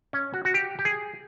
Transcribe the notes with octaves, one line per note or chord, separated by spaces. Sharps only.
C#4
F#4
F#4
G4
G4
G#4